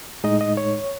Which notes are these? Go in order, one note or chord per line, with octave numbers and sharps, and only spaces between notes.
A2 G#3 D#4 D#5
D#5
C#5